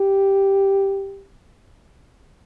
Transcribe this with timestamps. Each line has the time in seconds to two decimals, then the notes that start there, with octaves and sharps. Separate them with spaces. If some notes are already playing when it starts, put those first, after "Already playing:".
Already playing: G4